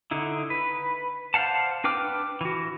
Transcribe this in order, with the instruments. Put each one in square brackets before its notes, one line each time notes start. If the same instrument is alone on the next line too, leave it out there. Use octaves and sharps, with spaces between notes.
[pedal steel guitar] D3 D#4 E4
B4
C5 D5 F5 F#5 A5
D4 B4 G5 D6 F6
E3 F#4